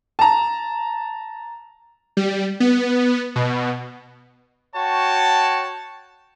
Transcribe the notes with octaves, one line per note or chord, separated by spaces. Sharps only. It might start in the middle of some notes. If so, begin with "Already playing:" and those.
A5 A#5
G3
B3
B2
F#4 C#5 G5 A5